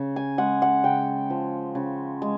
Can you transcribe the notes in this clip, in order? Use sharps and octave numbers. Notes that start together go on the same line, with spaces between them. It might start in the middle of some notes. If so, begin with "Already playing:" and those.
Already playing: C#3
G#5
G#3 F#5
F#5
C#3 G5
F3
C#3
G#3